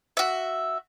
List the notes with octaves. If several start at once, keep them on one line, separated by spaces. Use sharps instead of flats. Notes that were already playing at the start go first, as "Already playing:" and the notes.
F#4 E5